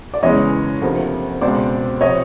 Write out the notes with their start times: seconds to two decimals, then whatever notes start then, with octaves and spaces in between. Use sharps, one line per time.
0.14 D5
0.23 F#1 E2 C#3 E3 G#3 C#5 D#5
0.82 D2 C3 F3 A#3
1.41 C#2 B2 G#3 C4 C5 D5
2.01 C3 F3 C#5 D#5